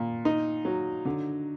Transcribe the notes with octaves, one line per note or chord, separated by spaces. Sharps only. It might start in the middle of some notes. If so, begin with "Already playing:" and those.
Already playing: A#2
D#4
F#3
D3